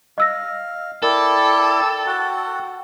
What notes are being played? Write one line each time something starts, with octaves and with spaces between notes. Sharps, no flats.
D#5 F5 E6 A#6
E4 A4 A#4 D5 G5
F#4 F#5